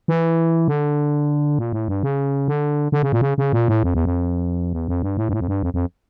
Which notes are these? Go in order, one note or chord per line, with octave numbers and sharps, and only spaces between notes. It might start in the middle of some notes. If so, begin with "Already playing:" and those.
E3
D3
A#2
A2
G2
C#3
D3
D3
C#3
A#2
C#3
C#3
A#2
A2
F2
E2
F2
E2
F2
G2
A2
G2
A2
F2
G2
F2
F2